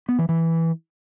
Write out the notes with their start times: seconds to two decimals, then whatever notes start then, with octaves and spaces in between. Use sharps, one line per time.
0.09 B3
0.19 E3
0.29 E3